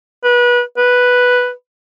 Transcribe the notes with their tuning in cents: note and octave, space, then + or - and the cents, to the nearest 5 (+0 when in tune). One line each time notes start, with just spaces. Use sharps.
B4 -25
B4 +0